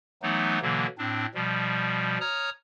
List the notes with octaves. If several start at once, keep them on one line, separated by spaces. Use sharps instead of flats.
E3 F#3 A3 B3 D#4
B2 D3 E3 F#3 A#3
A2 C4 D4
B2 F3 G3
C#5 A#5 D#6 F6